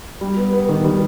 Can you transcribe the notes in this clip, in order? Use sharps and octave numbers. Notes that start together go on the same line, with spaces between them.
G3
B3
B3
D#3
G3